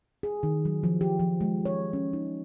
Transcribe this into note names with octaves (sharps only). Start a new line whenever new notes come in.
G#4
D#3
F#3
F3
G4
F3
G#3
C#5
C#4
D#4